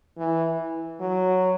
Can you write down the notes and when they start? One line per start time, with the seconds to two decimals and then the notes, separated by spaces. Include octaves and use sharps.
0.18 E3
1.01 F#3